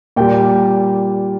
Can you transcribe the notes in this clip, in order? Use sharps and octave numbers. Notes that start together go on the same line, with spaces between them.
A#2 G3 G5